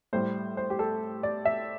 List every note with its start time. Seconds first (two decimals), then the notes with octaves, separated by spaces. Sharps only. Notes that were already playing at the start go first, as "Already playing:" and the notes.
0.13 A2 G3 C5
0.57 C5
0.70 G4
0.79 A4
1.23 D5
1.45 E5